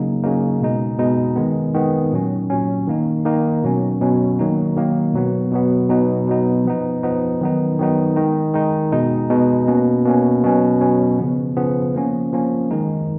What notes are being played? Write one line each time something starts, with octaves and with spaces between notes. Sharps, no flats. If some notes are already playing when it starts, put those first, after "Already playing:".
Already playing: C#3 F#3 A#3 D#4
C#3 F#3 A#3 D#4
B2 G#3 D#4
B2 G#3 D#4
D#3 G#3 B3
D#3 G#3 B3
A#2 F#3 C#4
A#2 F#3 C#4
D#3 A#3 D#4
D#3 A#3 D#4
B2 F#3 C#4
B2 F#3 C#4
D#3 F#3 A#3 D#4
D#3 F#3 A#3 D#4
B2 F#3 B3
B2 F#3 B3
B2 F#3 B3 D#4
B2 F#3 B3 D#4
F3 B3 D#4
F3 B3 D#4
D#3 F#3 B3 D#4
D#3 F#3 B3 D#4
D#3 G#3 D#4
D#3 G#3 D#4
B2 G#3 D#4
B2 G#3 D#4
B2 A#3 C#4
B2 A#3 C#4
B2 F#3 C#4
B2 F#3 C#4
C#3 F3 B3
C#3 F3 B3
F3 A#3 C#4
F3 A#3 C#4
D#3 G#3 D#4